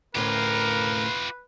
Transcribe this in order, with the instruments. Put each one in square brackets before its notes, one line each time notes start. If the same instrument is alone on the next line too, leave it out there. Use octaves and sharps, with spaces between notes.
[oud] D2 A2 C#4 [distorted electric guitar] F4 G4 [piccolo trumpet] A#4 [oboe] B4